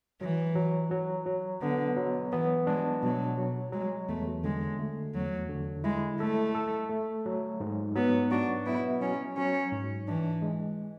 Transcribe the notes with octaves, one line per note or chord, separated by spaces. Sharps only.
E3 F#3
F#3
F#3
F#3
D3 B3
F#3
E3 B3
G#3 D4
B2 F#3
F#3
F#3 G#3
E2 A3
D3 G#3
A3
E2 F#3
D3
G#3 E4
A3 A4
A4
A3
F#3
G#2
F#3 B3
D4 F#4
B3 E4
F#3 C#4
F#3 C#4
G#2
E3 D4
G#3